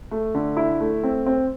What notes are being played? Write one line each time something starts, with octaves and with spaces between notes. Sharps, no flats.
A3
D3
E4
A3
C4
C4